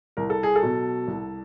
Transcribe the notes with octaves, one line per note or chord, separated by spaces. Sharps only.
C2 A#4
A4
G#4
A4
B2 F#3
C2